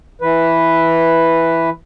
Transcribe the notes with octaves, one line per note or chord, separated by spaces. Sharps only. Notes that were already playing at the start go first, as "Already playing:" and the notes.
E3 B4